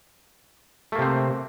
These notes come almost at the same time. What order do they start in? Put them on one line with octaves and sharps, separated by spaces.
A3 A#3 C3 C4